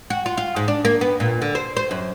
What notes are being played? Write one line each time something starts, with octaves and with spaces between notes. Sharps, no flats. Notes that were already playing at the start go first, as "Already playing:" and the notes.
F#4
F4
F4
G#2
D4
A#3
B3
A#2
D3
C5
C5
F#2